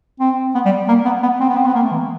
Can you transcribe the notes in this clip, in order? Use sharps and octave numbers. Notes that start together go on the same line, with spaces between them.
C4
B3
G3
A#3
B3
B3
C4
B3
C4
B3
A#3
A3
E3